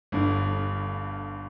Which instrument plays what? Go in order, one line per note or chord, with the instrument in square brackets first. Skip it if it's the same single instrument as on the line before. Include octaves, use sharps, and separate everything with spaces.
[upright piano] G1 G2 D3